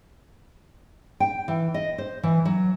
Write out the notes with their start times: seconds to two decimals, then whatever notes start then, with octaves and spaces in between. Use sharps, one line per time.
1.20 G5
1.48 E3
1.74 D#5
1.98 C5
2.23 E3
2.45 F#3